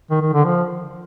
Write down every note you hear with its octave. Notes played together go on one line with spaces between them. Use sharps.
D#3
D#3
D3
F3